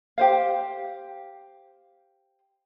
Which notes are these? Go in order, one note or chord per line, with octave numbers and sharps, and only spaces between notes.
G4 C5 F5